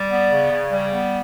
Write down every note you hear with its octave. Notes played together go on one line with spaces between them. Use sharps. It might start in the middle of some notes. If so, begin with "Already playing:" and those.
Already playing: G3 D5
B3
C#3
C#3
G3
B3